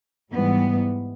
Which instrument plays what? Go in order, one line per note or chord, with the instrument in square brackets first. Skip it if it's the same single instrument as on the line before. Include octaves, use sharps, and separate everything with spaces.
[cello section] G#2 E3 G3 B3